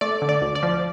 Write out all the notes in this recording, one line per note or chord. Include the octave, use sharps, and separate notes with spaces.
A3 D5
D3
D5
D2
D5
F3